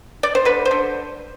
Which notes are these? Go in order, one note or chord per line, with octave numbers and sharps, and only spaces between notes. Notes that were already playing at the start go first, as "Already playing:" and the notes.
D5
C5
D3 B4
C5
D3